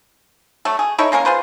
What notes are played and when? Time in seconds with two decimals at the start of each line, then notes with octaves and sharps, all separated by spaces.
0.65 F#3 A3
0.79 G#4
0.99 D#4 E4 A4 C#5
1.12 G#3 A#3 C#4 A#4
1.25 F4 G#4 B4 C5